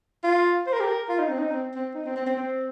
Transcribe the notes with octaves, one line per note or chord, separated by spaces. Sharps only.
F4
C5
A#4
G4
A#4
F4
D#4
C4
D#4
C4
C4
D#4
C4
C4
C4
C4